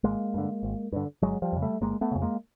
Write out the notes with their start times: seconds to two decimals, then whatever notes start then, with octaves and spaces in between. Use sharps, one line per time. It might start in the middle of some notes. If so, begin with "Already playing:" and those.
0.03 G#1 G#3 A#3
0.34 G2 D3
0.63 G#1
0.92 G2 D3
1.22 G1 F#3 G#3
1.42 F3 G3
1.52 F2 C#3
1.62 G3 A3
1.81 G1 G#3 A#3
2.01 A3 B3
2.11 F2 C#3
2.22 G#3 A#3